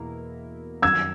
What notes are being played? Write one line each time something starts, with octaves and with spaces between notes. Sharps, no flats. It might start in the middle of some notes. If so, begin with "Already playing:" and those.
Already playing: E2 B2 A#3 E4 A#4
F#2 D#3 F#3 E6 G#6